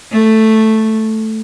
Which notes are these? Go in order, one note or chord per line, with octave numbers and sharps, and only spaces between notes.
A3